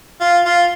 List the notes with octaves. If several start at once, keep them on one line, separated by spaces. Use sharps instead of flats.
F4
F4